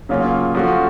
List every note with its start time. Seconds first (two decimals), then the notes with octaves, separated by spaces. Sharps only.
0.09 C#3 F#3 A#3 C#4 F4
0.55 F3 A3 C#4 F#4